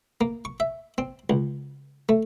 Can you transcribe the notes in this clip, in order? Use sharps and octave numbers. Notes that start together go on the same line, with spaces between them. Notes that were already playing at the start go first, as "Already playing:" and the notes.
A#3
C#6
E5
C4
C#2
A3